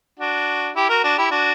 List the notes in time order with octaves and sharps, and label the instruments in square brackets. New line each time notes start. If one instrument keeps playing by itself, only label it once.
[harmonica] D4 F#4
E4 G4
F#4 A#4
D4 F#4
E4 G4
D4 F#4